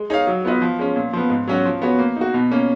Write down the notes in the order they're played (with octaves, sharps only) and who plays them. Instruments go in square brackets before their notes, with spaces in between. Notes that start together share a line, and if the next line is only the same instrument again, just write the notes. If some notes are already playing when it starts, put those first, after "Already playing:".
Already playing: [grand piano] G#3
D#4 G#4 C#5 F5
F#3
B3 F4 B4 D#5
F3
G#3 C#4
A#2
F3 B3
G#2
F#3 C#4 F#4
F3
B3 F#4 C#5
A#3
D#4 F#4
B2
A#3 C#4